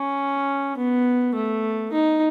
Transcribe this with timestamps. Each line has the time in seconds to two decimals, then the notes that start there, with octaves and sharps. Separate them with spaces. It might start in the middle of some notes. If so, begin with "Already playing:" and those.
Already playing: C#4
0.77 B3
1.35 A3
1.92 D#4